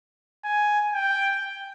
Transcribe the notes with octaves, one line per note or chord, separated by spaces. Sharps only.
G#5
G5